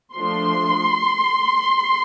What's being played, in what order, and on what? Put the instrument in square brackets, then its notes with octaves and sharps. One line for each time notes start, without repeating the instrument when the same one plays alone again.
[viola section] F3 A3 D4 C6